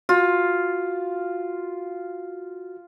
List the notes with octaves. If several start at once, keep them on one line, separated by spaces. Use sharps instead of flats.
F4 F#4